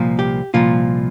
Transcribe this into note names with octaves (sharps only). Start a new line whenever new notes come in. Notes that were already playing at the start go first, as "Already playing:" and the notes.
Already playing: C2 A#2 F3
G4
C2 A#2 F3 F4